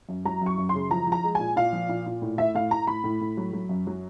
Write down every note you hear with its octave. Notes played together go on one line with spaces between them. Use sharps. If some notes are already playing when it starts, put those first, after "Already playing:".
F#2
F#3 A#5
F#2 C#6
F#2
C6
C#3
F3 A#5
F3
A#5
G#3
A#2 G#5
A#2 F5
F3
A#2
A#2
A2
A2 E5
A2 F5
A2 A#5
A2 B5
A2
A2
F#3
F#3
F#2
F#3